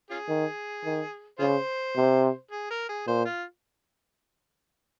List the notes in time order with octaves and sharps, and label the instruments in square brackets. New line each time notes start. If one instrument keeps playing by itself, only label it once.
[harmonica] C#4 F4 G#4
[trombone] D#3
D#3
[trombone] C#3 [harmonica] F4 G#4 C5
[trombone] C3
[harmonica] G#4
A#4
G#4
[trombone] A#2 [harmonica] C5
[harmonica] F4